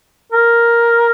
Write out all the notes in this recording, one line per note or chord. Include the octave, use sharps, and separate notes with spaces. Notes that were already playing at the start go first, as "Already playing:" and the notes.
A#4